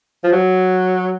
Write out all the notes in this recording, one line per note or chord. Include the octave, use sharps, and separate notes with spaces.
F3
F#3